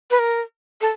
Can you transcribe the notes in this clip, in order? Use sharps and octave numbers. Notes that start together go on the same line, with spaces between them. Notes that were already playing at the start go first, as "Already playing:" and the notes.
B4
A#4
A4